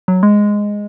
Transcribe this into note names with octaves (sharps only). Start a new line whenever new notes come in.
F#3
G#3